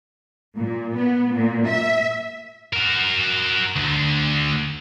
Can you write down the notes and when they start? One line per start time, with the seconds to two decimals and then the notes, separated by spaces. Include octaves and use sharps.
0.58 A#2
0.97 B3
1.32 A#2
1.68 E5
2.73 F#4 A#4
3.76 D2 D3